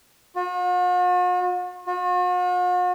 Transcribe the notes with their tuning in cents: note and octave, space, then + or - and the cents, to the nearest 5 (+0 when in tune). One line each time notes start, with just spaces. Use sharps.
F#4 -45
F#4 -45